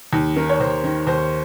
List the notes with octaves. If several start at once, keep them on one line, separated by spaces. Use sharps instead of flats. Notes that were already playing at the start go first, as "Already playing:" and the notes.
D#2
D#3 A#4
C#5
D#2 C5
D#3
D#2 C5